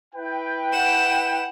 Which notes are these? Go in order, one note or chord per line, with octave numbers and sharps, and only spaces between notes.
E4 B4 G5
F#5 E7